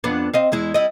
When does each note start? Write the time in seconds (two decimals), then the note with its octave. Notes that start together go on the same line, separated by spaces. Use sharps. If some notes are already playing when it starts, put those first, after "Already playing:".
0.04 F2 B3 D4
0.33 C4 D#5 F5
0.52 E2 G#3 E4
0.74 G3 E4 D#5